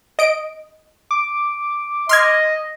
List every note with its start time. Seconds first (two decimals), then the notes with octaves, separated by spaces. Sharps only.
0.19 D#5 D7
1.11 D6
2.09 D#5 C6 F6 G#6